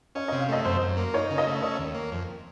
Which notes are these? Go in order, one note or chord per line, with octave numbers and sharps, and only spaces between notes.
C#4 D#5
D#5
C3
F5
A3 D#5
F#2 C5
F#2
A#3
D#4 C#5
C#3
D#5
A3
C#4 C#5
D#2
A#3
F2